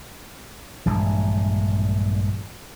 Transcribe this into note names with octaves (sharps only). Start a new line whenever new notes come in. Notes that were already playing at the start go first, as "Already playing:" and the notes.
A#1 G2 E3 G#3